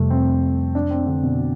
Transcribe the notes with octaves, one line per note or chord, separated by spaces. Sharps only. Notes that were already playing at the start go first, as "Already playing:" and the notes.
Already playing: F2 C3 G3 A3
C4
D4
C4
D3
B2